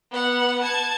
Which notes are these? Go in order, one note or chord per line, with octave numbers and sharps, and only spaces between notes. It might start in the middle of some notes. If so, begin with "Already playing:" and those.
B3 F#5
A5 G#6